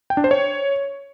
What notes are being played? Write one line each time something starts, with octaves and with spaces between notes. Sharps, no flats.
G5
D4
C5
C#5